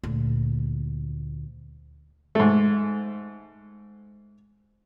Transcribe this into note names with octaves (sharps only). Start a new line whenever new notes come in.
D2 A#2
G#2 A3